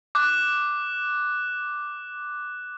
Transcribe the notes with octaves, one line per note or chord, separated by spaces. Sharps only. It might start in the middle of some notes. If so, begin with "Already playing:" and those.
D6 F#6